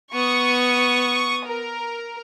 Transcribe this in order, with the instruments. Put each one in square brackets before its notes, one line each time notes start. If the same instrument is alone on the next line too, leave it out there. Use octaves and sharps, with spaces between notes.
[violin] B3 [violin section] C#6 D#6
[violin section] A#4